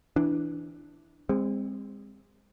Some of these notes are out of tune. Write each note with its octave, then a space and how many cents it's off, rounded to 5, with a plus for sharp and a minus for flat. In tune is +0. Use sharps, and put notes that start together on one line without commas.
E3 +0 D4 +0
G#3 -35 C4 +0